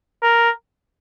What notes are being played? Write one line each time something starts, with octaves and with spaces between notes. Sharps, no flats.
A#4